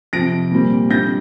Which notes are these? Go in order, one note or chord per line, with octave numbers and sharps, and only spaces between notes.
F2 C3 F3 A#6 D7
A#2 G3 C4
F2 D3 G3 D4 G6 A#6